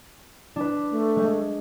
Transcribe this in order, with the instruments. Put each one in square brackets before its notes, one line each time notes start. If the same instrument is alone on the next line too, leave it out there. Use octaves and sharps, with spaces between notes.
[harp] D4 B4
[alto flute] A3
[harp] G#3